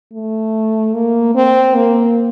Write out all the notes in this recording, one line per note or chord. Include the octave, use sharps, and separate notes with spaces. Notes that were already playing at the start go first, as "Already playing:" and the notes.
A3
A#3
C4
A#3